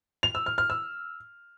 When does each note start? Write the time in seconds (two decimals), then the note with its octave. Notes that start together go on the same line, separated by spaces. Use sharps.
0.23 F7
0.35 E6
0.46 F6
0.58 F6
0.70 E6